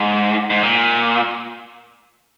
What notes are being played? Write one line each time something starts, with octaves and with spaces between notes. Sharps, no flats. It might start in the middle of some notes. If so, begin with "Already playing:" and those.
Already playing: G#2
G#2
A#2